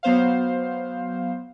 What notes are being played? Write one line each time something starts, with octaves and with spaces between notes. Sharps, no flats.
F#3 B3 C5 F5